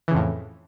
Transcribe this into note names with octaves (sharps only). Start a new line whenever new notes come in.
F2 A2 C#3 E3